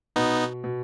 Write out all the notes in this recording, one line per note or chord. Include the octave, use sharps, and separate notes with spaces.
B2 B3 D#4
B2